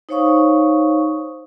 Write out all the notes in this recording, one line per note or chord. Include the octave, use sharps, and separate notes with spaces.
D#4 C5 C#5 F5 C#6 D#6